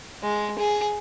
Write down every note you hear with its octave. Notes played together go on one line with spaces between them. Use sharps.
G#3
G#4